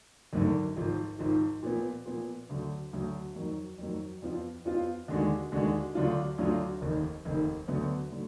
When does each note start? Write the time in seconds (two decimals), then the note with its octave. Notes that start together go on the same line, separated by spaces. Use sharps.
0.33 G#1 F#2 D3
0.77 G#1 G#2 F3
1.19 G#1 G#2 F3
1.62 A#2 F3 B3
2.06 A#2 F3 B3
2.49 D2 D3 F#3
2.93 D2 D3 F#3
3.36 F2 D#3 F#3
3.78 F2 D#3 F#3
4.22 F2 F3 B3 F4
4.65 F2 F3 B3 F4
5.08 D#2 D3 G#3 D4 F#4
5.52 D#2 D3 G#3 D4 F#4
5.95 D2 D3 F#3 D4 F4
6.38 D2 D3 F#3 D4 F4
6.81 F1 D#2 D#3
7.25 F1 D#2 D#3
7.68 D2 D3 F#3 B3
8.12 D3 F#3